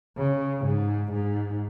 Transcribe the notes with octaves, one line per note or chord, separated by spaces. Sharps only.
C#3
G#2
G#2